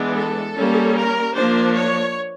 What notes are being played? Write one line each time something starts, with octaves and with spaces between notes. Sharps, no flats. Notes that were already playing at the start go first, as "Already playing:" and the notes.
Already playing: E3 G#3 B3 D4
A4
G3 A#3 C#4
A#4
F3 A#3 D4 C5
C#5